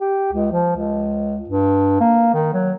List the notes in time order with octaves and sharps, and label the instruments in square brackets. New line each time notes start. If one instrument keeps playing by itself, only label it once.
[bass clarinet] G4
C#2
F3
C#2
G2
A#3
D#3
F#3